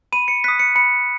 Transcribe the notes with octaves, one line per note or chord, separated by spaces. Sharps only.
B5 D#7
C#7
D#6 F#6 B6
C#7
B5 C#7